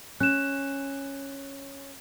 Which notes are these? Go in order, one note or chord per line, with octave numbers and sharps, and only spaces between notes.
C#4 F#6 E7